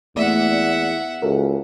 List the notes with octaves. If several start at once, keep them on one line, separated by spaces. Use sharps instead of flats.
E2 A3 A#3 D5 E5 F#5
C#2 F#4 A4 A#4